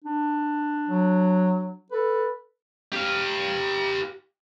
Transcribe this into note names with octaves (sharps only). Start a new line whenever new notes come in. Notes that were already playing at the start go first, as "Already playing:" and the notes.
D4
F#3
A4 B4
G4 F5